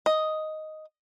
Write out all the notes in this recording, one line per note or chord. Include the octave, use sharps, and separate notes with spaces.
D#5